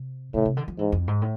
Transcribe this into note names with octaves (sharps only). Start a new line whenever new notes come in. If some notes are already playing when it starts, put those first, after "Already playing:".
Already playing: C3
A2 C3
C3
D3
F3
G#2 E3
F2
G#2
A2